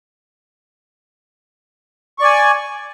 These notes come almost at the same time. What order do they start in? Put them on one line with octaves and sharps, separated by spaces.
C#6 D5 G#5